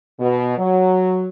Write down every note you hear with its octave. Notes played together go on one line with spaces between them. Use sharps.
B2
F#3